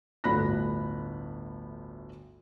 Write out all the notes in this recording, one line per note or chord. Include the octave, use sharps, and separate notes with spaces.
G1 D2 A2 B5 F#6 A#6